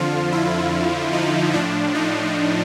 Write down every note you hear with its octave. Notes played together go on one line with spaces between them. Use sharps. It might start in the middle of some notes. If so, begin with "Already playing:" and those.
Already playing: F2 D3 F3 F4
E4
D#4
A2 F3 D4
D#4